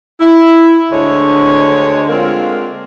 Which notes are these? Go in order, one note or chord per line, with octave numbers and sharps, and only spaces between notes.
E4
D2 D3 G#3 C5 C#5
D3 G#3 A#3 C4 F4 A#4